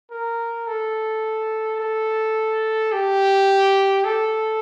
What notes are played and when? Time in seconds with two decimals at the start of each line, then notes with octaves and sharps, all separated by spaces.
0.11 A#4
0.67 A4
1.80 A4
2.92 G4
4.05 A4